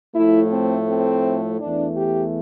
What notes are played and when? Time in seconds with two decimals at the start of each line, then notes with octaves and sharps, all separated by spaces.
0.15 A2 F3 A3 E4
0.51 C4
0.88 C4
1.60 E2 E3 A3 D4
1.97 G4